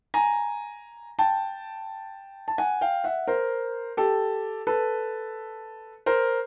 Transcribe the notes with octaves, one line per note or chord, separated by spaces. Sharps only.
G#5 A#5
G5 A5
A5
F#5 G#5
F5 G5
E5 F#5
A#4 C5
G4 A4
A4 B4
A#4 C5